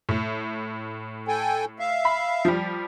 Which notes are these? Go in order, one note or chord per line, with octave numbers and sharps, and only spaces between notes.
A2
A4 G5 G#5
E5 F5
B5
F3 G3